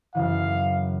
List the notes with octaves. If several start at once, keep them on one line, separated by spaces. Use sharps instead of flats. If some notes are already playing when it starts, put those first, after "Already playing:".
F#2 C#3 E3 F5